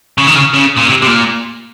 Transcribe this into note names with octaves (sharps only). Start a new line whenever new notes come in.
C#3
D#3
C#3
C#3
A#2
C3
C3
A#2